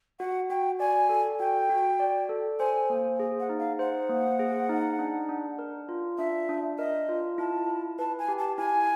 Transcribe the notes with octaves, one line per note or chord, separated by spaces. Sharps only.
F#4 F#5
F#4 G5
D5 G#5
A4
F#4 G5
F#4
D5
A4
C5 G#5
A#3
G#4
F#5
D#4
F5
C5 F#5
A#3
G#4
D#4
D4
D4
A#4
F4
D4 E5
D4
A#4 D#5
F4
E4 A5
E4
B4 A5
G#5
G4
A5
E4 G#5